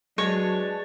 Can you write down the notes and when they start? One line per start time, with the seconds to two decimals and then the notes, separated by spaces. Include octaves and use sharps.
0.18 F#3 G#3 D4 B4 C#5 A5